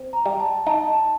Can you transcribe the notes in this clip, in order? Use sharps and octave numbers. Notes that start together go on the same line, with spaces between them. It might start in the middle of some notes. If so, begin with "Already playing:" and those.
Already playing: C4
A#5
G3
A5
D#4 A5